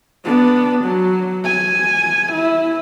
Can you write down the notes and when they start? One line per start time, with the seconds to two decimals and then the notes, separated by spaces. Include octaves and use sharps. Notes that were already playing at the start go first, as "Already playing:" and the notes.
0.25 B3 D4
0.85 F#3
1.45 G#5
2.33 E4